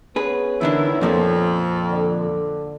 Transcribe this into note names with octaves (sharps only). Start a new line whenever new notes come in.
B3 C#4 G#4 B4
E2 D3 D#3 D4 E4
F2 A#2 F3 A#3
D3